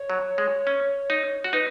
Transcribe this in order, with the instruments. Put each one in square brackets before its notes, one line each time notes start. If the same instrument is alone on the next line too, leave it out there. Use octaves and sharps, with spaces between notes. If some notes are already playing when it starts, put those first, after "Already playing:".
Already playing: [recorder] C#5
[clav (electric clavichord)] F#3
G#3
C#4
D#4
F#4
[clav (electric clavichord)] D#4 [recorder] B4